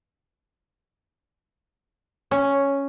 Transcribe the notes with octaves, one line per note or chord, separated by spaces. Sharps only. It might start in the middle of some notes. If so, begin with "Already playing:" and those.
C#4